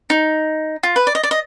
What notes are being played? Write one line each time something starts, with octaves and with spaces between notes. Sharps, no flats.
D#4
F4
B4
D5
D#5
D5
D#5